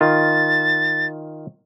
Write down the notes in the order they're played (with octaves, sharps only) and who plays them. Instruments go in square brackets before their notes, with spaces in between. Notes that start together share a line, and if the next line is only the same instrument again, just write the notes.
[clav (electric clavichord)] D#3 F4 [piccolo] A6